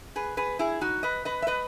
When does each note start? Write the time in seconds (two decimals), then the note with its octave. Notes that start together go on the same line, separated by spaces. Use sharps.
0.16 G#4 B4
0.37 G#4 B4
0.59 E4 G#4
0.81 D#4 F#4
1.03 B4 D#5
1.25 B4 D#5
1.42 E5
1.47 B4 D#5